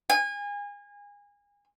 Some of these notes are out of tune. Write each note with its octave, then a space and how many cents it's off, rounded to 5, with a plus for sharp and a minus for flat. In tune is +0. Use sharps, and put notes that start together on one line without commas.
G#5 -30